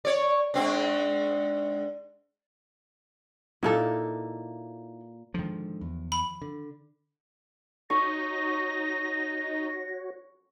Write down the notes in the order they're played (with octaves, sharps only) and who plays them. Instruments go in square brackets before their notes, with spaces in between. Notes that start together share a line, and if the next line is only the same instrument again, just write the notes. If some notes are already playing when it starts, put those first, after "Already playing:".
[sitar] C#5 D5
G#2 C4 D4
[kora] A#2 A#3 A4 [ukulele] D#4 E4
[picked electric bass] G#2 D3 [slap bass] D#3 F3
[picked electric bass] E2
[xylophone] B5
[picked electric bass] D3
[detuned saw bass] D#4 [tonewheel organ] F#4 C#5 [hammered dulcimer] C#6 [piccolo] A#6